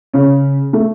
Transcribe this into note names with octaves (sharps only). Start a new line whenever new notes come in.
C#3 C#4
A3